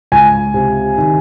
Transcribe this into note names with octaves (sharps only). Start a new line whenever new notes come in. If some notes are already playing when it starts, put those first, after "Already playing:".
C#2 G#5
C3
D#3